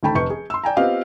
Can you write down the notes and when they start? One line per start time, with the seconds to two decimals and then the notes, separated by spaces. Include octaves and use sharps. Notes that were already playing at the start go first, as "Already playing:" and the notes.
0.03 D2 D#3 A3 G5 A5 B5
0.15 F1 B4 C#6 G6 C#7
0.30 G#4
0.50 C6 E6
0.64 D5 G5 G#5 A#5
0.77 B3 C4 F4 G4 D#5 F5